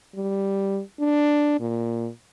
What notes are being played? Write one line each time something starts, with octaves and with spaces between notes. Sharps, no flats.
G3
D4
A#2